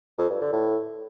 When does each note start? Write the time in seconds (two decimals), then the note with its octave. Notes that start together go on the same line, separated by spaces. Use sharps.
0.18 F2
0.30 G2
0.41 D3
0.53 A2